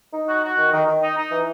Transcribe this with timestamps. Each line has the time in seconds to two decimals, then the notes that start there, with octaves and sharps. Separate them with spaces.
0.13 D#4
0.27 F#4
0.43 F#4
0.57 D#3
0.72 D#3
0.87 D#3
1.01 D#4
1.17 D#4
1.31 E3